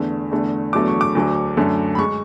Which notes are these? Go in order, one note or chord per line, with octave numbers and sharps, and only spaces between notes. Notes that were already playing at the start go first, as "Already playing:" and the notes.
Already playing: E2 D3 A3
E2 D3 A3
E2 D3 F#3 A3 D6
C#6
D6
D2 D3 F#3 A3
F#2 D3 A3
B5
G#3 C#6